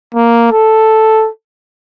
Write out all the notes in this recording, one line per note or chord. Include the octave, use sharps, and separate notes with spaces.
A#3
A4